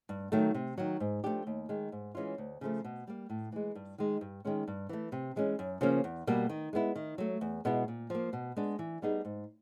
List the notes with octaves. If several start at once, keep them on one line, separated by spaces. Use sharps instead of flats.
G2
D#3 F#3 A3
C3
D#3 F#3
G#2
F3 A3 D4 G4
D#2
D#3 G#3
G#2
E3 G#3 C#4 F4
D2
C#3 F3 A3
B2
G3 A#3
A2
E3 G#3
G2
D#3 G#3
G2
D#3 G#3 C#4
G2
E3 A3
C3
E3 G#3 C#4
F#2
C#3 F3 A#3 C#4
E2
B2 G3 A#3
D#3
G#3 B3 E4
D#3
F#3 A3
E2
B2 G#3 B3 E4
A#2
F3 A#3
B2
G#3 B3 D4
E3
G3 B3 D#4 G#4
G#2